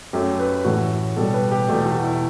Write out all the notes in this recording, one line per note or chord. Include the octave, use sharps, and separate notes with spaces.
F#2 F#3 A3 G4
B4
A2 E3 A3 F#4
B2 G3 A4
B4
G4
E2 B2 A3 G4
F#4
E4